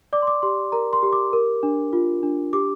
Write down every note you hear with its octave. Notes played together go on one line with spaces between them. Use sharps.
D5 D6
C6
D6
G4 C6
A#4 A#5
C6
G4
D6
A#4
D4
F4
D4
G4 D6